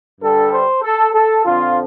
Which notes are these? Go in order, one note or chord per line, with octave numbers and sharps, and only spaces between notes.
G2 D3 G3 A4
C5
A4
A4
F2 D3 F3 C4 F4